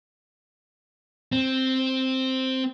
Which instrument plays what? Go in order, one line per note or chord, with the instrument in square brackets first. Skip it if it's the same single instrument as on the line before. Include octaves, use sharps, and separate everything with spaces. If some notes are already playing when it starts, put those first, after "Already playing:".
[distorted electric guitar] C4